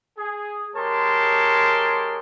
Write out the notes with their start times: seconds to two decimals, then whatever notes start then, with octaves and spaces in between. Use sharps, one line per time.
0.18 G#4
0.75 G#3 G4 A#4 C#5 A5 C6